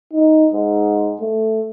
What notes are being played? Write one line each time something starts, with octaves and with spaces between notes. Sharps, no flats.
D#4
G#2
A3